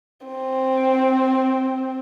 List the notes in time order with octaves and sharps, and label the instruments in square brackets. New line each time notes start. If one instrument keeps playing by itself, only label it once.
[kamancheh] C4